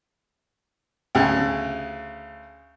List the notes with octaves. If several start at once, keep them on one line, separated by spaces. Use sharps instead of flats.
D2 C#3